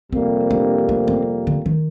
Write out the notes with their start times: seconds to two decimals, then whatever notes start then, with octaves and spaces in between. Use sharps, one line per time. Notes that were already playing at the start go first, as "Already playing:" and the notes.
0.12 F2 C3 G3 A#3 C4
0.51 D4
0.89 D4
1.08 C4
1.47 D3
1.66 D#3